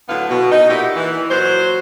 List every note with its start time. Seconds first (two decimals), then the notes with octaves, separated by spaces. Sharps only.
0.09 A2 D3 F#3 B3 B4 F5
0.29 B2
0.52 D#4
0.69 A#2 D#4 E4 F#4 G4
0.96 E3
1.31 A#2 F#3 F#4 C5